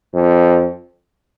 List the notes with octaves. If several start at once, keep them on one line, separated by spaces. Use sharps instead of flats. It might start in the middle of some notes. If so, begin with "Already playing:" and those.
F2